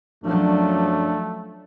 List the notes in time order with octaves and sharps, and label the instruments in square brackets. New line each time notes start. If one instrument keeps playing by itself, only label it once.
[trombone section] F#2 C#4 D4 [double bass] F3 F#3 [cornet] A3